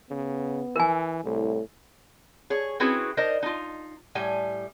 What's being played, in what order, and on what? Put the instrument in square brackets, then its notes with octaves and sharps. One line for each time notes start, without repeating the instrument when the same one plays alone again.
[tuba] C#3 [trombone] B3
[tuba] E3 [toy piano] A#4 G#5
[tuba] C2 [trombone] A2
[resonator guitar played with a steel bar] G#4 C#5
C4 C#4 E4 F#4 G#4 B4
D#4 A#4 C5 D5 D#5
D#4 F4
A2 G3 G#5